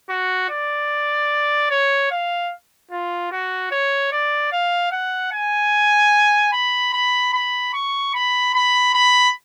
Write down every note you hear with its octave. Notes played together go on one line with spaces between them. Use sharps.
F#4
D5
C#5
F5
F4
F#4
C#5
D5
F5
F#5
G#5
B5
B5
B5
C#6
B5
B5
B5